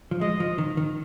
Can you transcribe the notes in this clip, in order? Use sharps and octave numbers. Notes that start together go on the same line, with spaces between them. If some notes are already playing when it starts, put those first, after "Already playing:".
F3
G#3 D#5
F3
D#3
D#3